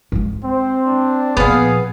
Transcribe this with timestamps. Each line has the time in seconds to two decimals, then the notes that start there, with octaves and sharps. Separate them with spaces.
0.12 G#2 G#3
0.44 C4 C5
0.86 D4
1.37 A#2 F3 B3 G#4 F5